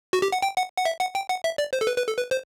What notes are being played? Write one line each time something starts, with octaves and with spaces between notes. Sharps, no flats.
F#4
G4
F#5
G5
F#5
F#5
E5
F#5
G5
F#5
E5
D5
C5
A4
B4
B4
A4
B4
C5